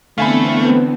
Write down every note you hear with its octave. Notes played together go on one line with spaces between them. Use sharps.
D3 E3 A3 B3 C4 F5 G#5 B5